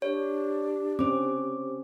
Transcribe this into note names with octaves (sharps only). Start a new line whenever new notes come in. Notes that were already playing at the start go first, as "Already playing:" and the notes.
D4 G4 C#5
C4 C#4 C5 D6